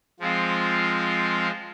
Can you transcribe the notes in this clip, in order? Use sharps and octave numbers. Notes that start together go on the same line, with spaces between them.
F3 G#3 C4 F4